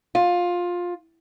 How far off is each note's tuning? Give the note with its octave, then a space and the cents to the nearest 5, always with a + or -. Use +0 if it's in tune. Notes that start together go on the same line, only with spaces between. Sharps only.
F4 +15